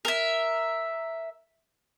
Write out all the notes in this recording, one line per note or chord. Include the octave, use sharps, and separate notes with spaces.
A#4 E5